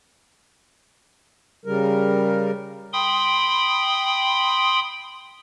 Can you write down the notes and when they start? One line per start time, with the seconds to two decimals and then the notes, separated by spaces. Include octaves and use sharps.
1.65 C#3 G3 A#4
2.93 G5 B5 C6 D#6